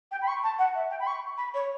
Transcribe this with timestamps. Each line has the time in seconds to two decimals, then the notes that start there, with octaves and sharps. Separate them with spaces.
0.11 G5
0.22 B5
0.28 C#6
0.43 A5
0.58 F#5
0.75 E5
0.90 G5
1.00 B5
1.07 C#6
1.37 B5
1.54 C#5